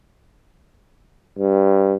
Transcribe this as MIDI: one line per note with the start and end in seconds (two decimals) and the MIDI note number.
1.38 1.96 43